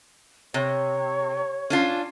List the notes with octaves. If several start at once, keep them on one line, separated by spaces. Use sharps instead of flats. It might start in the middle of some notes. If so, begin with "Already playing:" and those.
C3 C#5
C#4 D4 F4